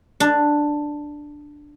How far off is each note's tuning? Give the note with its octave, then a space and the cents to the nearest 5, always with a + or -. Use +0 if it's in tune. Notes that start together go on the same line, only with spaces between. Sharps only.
D4 +5